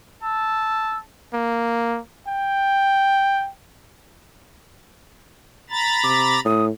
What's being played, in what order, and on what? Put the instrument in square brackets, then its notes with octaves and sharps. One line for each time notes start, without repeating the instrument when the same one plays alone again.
[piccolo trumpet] A5 [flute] E6
[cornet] A#3
G5
[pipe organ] A#5 B5 A6
[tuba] C3 [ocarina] D6
[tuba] A2 [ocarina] D#6